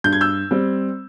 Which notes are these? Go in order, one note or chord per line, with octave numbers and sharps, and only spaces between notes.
G2 G6
G#6
E6 G6
G3 C4